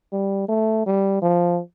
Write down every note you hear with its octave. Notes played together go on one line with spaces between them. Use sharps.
G3
A3
G3
F3